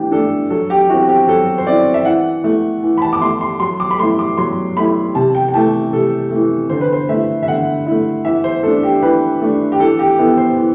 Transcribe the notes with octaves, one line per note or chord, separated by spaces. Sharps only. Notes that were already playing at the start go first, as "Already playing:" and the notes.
Already playing: E3 A3 D4 G4
A3 D4 A4
F#3 A4
G4
C4 E4 F#4
G4
F#3 A4
C5
C4 E4 D5
E5
E3 F#5
A3 E4
E3
B5
A5
D6
A3 E4 C6
C6
F#3 C6
D6
B5
A3 E4 C6
D6
F#3 C6
A3 E4 B5
C3 A5
G5
G5
E3 A3 A5
C3 A4
E3 A3
D3 C5
B4
C5
A3 E4 E5
E5
D3 F#5
A3 E4
E3 E5
C5
A3 D4 A4
G4
E3 B4
A3 D4
G4
E3 A4
G4
B3 E4 A4
C5
E3